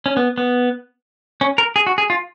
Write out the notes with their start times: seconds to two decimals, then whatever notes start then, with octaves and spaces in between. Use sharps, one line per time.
0.06 C#4
0.17 B3
0.38 B3
1.41 C#4
1.58 A#4
1.76 G#4
1.87 F#4
1.98 G#4
2.10 F4